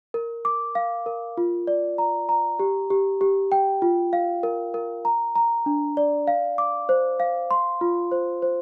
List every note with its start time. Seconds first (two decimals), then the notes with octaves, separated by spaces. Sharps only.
0.14 A#4
0.45 D6
0.75 F5
1.06 A#4
1.38 F4
1.67 D5
1.98 A#5
2.29 A#5
2.59 G4
2.90 G4
3.21 G4
3.52 G5
3.82 F4
4.13 F5
4.43 A#4
4.74 A#4
5.05 A#5
5.36 A#5
5.66 D4
5.97 D5
6.27 F5
6.58 D6
6.89 C5
7.20 F5
7.51 C6
7.81 F4
8.11 C5
8.42 C5